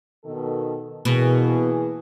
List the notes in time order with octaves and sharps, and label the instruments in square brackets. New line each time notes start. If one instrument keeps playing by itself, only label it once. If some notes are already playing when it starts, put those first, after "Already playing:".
[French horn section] B2 D#3 A4
[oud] B2 [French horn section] E3 A#3 G#4